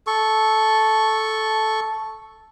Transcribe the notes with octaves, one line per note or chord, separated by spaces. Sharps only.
A4 C#6